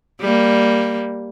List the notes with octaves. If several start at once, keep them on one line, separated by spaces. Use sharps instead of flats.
G3 A#3